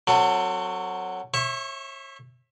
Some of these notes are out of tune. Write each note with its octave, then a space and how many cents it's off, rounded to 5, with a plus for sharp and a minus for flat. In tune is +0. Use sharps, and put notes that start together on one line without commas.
F#3 +0 C4 +0 A4 +35
C#5 -40 E5 +0 C#6 +0